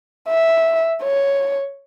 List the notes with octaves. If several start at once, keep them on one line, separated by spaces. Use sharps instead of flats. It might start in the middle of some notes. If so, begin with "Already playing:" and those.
E5
C#5